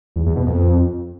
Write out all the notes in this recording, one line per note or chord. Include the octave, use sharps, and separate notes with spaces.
E2
E2
B2
F2